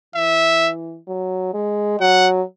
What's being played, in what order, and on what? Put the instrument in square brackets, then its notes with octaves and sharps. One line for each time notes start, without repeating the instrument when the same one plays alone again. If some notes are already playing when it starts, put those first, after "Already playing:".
[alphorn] E3 [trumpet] E5
[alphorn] F#3
G#3
[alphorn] F#3 [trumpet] F#5